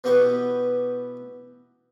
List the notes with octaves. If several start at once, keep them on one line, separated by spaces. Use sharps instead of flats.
B2 E3 B3 G4 G5 C#6